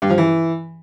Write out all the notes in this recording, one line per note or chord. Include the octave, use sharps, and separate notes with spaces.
G2
F3
E3